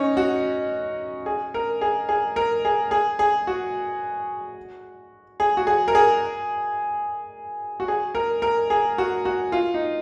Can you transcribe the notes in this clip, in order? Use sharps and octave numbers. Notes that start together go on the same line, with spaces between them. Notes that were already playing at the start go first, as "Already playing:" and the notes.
Already playing: C#4 D#4
F#4
G#4
A#4
G#4
G#4
A#4
G#4
G#4
G#4
F#4
G#4
F#4
G#4
A#4
G#4
F#4
G#4
A#4
A#4
G#4
F#4
F#4
F4
D#4